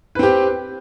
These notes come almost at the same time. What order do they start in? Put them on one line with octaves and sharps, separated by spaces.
B4 C4 G4